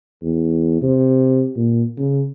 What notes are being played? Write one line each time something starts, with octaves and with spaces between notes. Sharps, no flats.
E2
C3
A#2
C#3